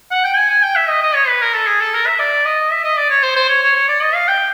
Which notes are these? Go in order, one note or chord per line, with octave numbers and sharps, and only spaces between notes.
F#5
G5
G#5
G#5
G5
E5
D#5
D#5
C#5
B4
A#4
A4
G#4
A4
A#4
E5
D5
D#5
E5
D#5
D5
C#5
C5
C5
C#5
C#5
C#5
D5
D#5
F5
G5